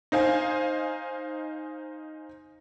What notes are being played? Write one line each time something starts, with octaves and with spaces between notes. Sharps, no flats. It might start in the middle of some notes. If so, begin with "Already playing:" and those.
D#4 C5 F5 G#5